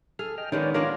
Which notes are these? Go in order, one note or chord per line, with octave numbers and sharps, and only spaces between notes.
G#4 A4 F6
D#5 G5 F6
D#3 G#3 B3 C#4 C#5 D5
A#3 D4 F4 C#5 F5 A#5